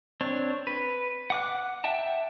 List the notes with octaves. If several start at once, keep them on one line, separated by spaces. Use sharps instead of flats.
C4 D4 C#5
B4
F#5 D6 F#6
E5 F#5 G5 A5